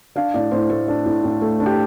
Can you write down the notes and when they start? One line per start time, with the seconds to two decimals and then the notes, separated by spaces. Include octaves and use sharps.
0.16 D4 F5
0.34 A2 D5
0.51 A2 C5
0.69 A3 A4
0.88 D4
1.06 A2
1.24 A2
1.41 A3
1.60 D4
1.66 G4